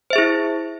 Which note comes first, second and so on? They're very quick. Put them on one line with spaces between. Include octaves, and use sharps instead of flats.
C5 E5 G#4 E4